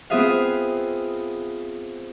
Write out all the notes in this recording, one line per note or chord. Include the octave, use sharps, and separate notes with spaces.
B3 C4 F4 G#4 E5 F5